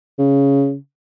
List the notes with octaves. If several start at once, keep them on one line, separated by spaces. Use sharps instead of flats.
C#3